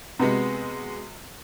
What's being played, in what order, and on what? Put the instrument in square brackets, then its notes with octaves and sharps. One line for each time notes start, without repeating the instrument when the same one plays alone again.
[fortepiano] C3 [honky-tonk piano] G#3 B3 F#4